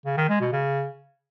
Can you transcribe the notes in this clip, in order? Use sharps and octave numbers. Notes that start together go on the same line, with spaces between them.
C#3
D#3
G#3
B2
C#3